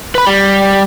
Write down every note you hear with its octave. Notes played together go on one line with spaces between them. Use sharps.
B4 B5
G3